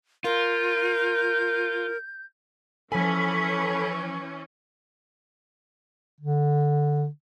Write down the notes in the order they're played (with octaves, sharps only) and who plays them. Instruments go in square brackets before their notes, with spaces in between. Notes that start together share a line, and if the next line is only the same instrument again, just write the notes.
[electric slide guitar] F4 [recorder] A#4 [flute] G6
[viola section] E3 C#4 [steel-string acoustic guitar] F3 G#5 [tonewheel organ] A4 B5
[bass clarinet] D3